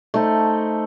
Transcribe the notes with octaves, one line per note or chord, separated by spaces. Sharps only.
A3 D#4 C5 A5